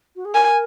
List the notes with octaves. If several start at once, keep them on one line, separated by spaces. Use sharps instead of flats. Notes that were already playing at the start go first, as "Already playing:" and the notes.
F#4
G#4
A#4 G#5